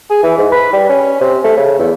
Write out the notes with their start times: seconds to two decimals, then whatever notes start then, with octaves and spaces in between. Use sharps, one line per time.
0.10 G#4
0.23 E3
0.38 G#2
0.52 B4
0.73 G3
0.89 C#4
1.21 C3
1.44 A3
1.57 C#3
1.79 E2